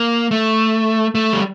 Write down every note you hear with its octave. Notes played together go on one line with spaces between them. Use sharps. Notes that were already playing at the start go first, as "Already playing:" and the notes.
Already playing: A#3
A3
A3
G3